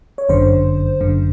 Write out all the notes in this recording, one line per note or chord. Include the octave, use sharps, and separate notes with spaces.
C#5
G1 F#2 D3 C5
G1 F#2 D3